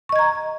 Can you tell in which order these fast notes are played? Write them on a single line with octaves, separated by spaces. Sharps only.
C#6 D#5 G#6 A#5